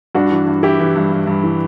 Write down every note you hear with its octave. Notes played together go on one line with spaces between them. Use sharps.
G2 D4 F#4
E3
G2
E3 E4 G4
E3
G2
G2
G2
E3